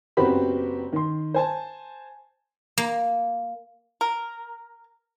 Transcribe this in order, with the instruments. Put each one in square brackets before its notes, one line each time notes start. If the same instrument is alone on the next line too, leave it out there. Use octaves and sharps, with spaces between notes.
[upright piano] F#1 B3 C4 F#4 G4 B5
D#3 C6
C5 G#5 A5
[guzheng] A#3
[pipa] A#4